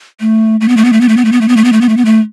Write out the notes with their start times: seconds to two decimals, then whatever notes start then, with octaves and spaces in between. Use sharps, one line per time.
0.20 A3
0.61 A3
0.68 B3
0.77 A3
0.85 B3
0.93 A3
1.01 B3
1.09 A3
1.17 B3
1.25 A3
1.32 B3
1.41 A3
1.48 B3
1.57 A3
1.64 B3
1.73 A3
1.81 B3
1.89 A3
1.97 B3
2.05 A3